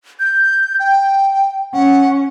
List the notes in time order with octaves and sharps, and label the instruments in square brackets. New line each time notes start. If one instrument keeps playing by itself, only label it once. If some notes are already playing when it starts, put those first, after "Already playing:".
[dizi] G6
G5
[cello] C#4 [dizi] F#5